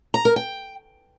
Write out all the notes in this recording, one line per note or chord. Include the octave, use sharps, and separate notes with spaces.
A#5
A#4
G5